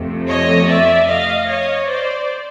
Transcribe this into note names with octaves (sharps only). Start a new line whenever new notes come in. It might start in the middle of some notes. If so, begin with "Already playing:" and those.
Already playing: F2 C3 F3 A3
C#5 D#5
D5 E5
D#5 F5
C#5 D#5
C5 D5